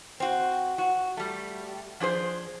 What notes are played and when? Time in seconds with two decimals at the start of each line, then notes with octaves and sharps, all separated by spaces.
0.20 C4 F#4
0.78 F#4
1.17 G3 A3
2.00 F3 D4 G#4 C5